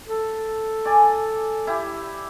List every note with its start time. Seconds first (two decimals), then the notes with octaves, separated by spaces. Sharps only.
0.07 A4
0.85 D5 G#5
1.67 E4 G4